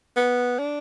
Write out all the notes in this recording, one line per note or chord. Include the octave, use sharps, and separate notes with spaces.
B3
D4